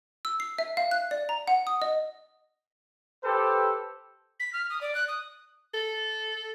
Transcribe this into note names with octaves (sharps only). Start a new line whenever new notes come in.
E6
C7
E5
F5
F#6
D5
A#5
F#5
D#6
D#5
G4 A4 B4 C5
B6
F6
D#6
D5
F#6
D#6
A4